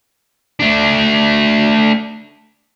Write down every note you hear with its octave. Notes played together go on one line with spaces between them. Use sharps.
A3 D4